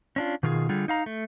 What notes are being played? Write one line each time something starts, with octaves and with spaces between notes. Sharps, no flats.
C#4 D4 F4
B2 D#3 F4 G4 G#4
D3 G3 F4 G#4
D#4 F5 A#5
A3